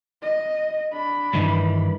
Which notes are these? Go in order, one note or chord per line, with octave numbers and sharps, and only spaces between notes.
D#5
D4 B5
G2 D#3 E3